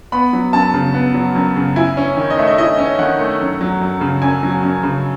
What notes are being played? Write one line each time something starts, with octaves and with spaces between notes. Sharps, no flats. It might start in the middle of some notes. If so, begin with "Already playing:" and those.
B3 B5
F#3
F#2 A5
C#3
B3
F#3
F#2
C#3
E4 G#5
C#4
D#3
D#5
A3 E5
D#5
E4 D#5
C#4
D#3 F#5
A3
F#2
F#3
F#2
C#3
F#2 G#5
F#3
F#2
C#3